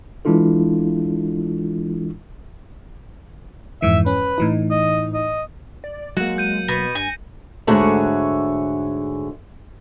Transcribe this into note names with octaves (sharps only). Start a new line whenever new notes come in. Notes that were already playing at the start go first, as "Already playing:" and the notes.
E3 G#3 D4 E4 F4 A4
F2 G#2 E3 E5
C#4 B4
A2 E3 D#4
D#5
D#5
D5
F#3 G#3 A#3 F#4 C#7 F#7
G6 D#7
B2 B3 C#6 A#6
G2 G#5
G#2 D3 A3 F#4 G#4 C#5